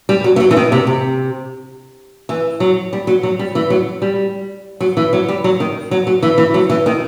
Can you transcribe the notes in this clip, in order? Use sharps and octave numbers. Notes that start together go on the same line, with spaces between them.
G3
F#3
E3
F#3
E3
D#3
C3
C3
E3
F#3
G3
F#3
F#3
G3
E3
F#3
G3
F#3
E3
F#3
G3
F#3
D#3
F#3
F#3
E3
E3
F#3
E3
D#3